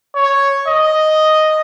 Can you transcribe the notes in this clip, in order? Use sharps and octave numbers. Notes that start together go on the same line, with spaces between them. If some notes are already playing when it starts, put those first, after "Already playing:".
C#5
D#5